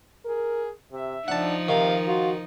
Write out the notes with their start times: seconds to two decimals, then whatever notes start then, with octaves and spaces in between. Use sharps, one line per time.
0.25 G#4 A#4
0.92 C3 E5
1.28 F3 D4 D#4 F#5 A5
1.68 C3 D#3 F5
2.08 F4 F#4